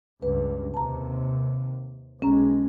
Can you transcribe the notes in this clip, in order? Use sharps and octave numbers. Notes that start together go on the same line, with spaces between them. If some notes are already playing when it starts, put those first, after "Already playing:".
C#2 G2 B4
D#2 C3 A5 A#5
B1 G#3 C#4 A#5